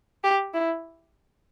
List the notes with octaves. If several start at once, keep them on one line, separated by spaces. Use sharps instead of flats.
G4
E4